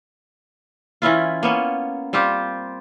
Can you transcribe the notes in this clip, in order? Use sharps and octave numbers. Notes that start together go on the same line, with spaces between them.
E3 C#4 E4 F4
A#3 B3 C#4
G3 C4 F4 G4